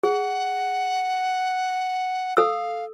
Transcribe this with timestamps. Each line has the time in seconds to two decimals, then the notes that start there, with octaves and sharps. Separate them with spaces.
0.03 G#4 F#5
2.37 A4 F5 E6